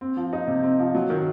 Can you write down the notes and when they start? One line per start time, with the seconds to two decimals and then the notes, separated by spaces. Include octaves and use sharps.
0.01 C4
0.17 F3
0.33 D#4
0.48 C3
0.63 C4
0.79 F3
0.95 F#3
1.10 D#3